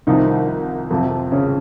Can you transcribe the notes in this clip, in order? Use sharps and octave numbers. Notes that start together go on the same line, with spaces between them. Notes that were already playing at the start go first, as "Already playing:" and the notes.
C2 C3 D#3 F3 D#4
F2 C3 F3
C#3 C#4